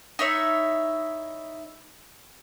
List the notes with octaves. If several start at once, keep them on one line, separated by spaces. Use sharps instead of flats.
D#4 E4 C#5 E5